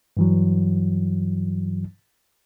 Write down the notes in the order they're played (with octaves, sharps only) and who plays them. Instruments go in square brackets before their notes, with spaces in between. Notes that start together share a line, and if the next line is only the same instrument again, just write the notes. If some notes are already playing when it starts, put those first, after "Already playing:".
[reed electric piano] G2 E3 F#3